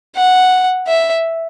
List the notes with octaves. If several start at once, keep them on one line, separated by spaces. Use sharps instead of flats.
F#5
E5